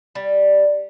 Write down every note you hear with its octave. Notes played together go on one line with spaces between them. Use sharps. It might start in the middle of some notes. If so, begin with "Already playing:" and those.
G3